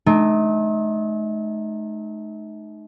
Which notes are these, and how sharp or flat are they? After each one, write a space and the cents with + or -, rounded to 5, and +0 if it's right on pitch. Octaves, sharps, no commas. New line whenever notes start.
A3 -45 D#4 -20